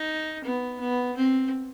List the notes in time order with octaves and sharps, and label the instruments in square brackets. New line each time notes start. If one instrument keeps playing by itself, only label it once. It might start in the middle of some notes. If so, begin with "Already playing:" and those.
Already playing: [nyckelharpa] D#4
B3
B3
C4